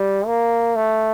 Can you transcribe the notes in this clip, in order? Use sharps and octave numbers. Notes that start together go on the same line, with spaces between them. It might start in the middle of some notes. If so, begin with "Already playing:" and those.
Already playing: G3
A#3
A3